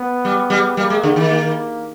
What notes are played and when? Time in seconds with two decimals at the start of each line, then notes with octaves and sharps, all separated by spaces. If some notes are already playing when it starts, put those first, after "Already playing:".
Already playing: B3
0.25 G3
0.50 G3
0.77 G3 A#3
0.90 G#3
1.03 D3
1.16 D#3
1.30 A#3